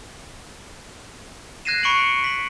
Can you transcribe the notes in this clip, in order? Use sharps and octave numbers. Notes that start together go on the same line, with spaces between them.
F#6 G#6 A#6 C7 D#7 E7
B5 C#6 C#7 D7 F#7
B6 F#7